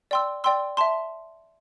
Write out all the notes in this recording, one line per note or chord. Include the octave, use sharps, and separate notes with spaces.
D5 G5 C6 E6
D5 G5 C6 E6
E5 A5 C6